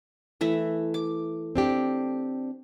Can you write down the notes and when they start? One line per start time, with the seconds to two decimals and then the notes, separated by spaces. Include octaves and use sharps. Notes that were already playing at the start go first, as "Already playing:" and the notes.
0.41 E3 A3 E5
0.94 D6
1.56 C4 D4 G4